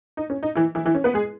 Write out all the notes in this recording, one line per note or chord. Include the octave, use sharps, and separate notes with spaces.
D#4
C#4
D#4
E3 E4
E3 E4
E3 E4
C#4
B3 B4
G#3 G#4